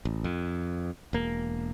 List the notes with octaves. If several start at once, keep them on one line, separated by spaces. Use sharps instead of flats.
A1
F2
E1 A#3